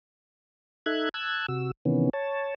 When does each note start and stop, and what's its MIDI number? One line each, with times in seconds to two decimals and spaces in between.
0.86 1.09 63
0.86 1.09 69
0.86 1.09 76
0.86 1.09 90
0.86 1.09 92
1.14 1.46 81
1.14 1.46 88
1.14 1.46 90
1.14 1.46 92
1.49 1.71 48
1.49 1.71 66
1.49 1.71 88
1.85 2.10 48
1.85 2.10 51
1.85 2.10 52
1.85 2.10 59
1.85 2.10 61
2.13 2.54 73
2.13 2.54 81